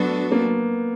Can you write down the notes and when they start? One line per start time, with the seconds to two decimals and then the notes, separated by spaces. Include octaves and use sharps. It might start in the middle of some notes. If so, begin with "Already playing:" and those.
Already playing: F#3 A3 B3 D4 F#4 A4
0.32 A#3